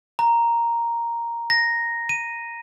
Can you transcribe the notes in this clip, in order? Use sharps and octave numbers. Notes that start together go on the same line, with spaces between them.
A#5
A#6
D#7